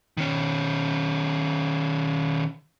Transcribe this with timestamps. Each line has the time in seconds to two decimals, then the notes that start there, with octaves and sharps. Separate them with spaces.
0.17 D#3 C#4